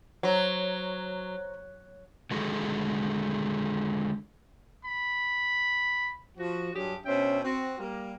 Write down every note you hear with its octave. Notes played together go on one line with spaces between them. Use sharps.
F#3 C5 C#5 A#5
D3 D#3 G#3 F#4 G#4 A4
B5
F3 F#4
G2 F#3 D4 G4 G#4
B2 C#4 D4 C5 E5 G5
C4 F#4
G3 A#3